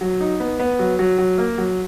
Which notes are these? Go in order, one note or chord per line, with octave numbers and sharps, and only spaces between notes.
F#3
D#4
B3
B3
F#3
F#3
F#3
A#3
F#3